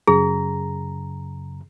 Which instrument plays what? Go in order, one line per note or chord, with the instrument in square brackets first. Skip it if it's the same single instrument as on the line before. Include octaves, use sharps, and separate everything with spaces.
[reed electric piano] F#2 C#3 A#5 [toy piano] G#4